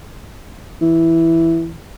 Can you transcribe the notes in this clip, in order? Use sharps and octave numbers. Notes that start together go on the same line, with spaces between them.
E3